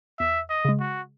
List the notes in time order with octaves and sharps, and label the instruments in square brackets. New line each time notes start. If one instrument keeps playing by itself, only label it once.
[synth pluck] E2 [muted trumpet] E5
[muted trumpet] D#5
[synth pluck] C#3 G#3
[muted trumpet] F#4